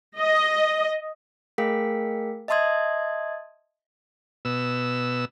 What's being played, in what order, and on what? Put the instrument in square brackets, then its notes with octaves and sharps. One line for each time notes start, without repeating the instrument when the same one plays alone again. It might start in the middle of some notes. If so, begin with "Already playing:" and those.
[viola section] D#5
[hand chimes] A3 G#4 A#4 F5 G5 B6
D#5 E5 A5 C6 D#6 G#6
[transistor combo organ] B2 E6